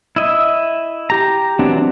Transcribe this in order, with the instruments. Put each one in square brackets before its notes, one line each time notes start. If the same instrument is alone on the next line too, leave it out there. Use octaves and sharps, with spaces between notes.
[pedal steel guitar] E4 D#5 E5
G4 A#5
E3 F#3 B3 C4 D4